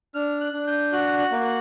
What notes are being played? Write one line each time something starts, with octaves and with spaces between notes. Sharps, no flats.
D4 F6
F#6
D4
G6
F#4 F#6
F#6
A#3
F#6